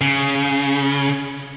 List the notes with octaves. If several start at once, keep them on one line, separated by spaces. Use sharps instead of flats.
C#3